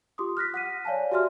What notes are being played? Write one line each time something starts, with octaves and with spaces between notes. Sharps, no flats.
F4 G4 C6 D6 D#6
F6 F#6 A#6 B6
F#5 B6 D#7
C#5 D5 F5 G#5 A5
F#4 G4 D5 E5 C6 F6